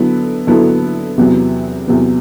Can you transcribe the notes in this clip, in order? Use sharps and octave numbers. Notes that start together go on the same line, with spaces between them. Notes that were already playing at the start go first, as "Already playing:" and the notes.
Already playing: D3 F#3 B3 E4 A4
D3 F#3 B3 E4 A4
E2 C3 F#3 B3
E2 C3 F#3 B3